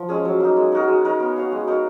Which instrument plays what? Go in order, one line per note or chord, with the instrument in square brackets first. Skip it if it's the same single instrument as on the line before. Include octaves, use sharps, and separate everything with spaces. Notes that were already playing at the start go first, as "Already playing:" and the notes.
Already playing: [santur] F3
G#3 C#4 G#4
F#3
A#3 D#4
G#3
D#4 F#4 A#4
G#3
D#4 A#4 C#5
B3
F#4 C#5 F5
G#3
D#4 A#4 C#5